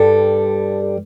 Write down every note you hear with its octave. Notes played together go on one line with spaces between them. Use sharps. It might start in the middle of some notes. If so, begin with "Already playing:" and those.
Already playing: G2 G3 A4